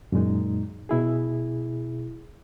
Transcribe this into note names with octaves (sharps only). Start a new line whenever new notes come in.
F#2 A#2 G#3 D#4
B2 E4 G#4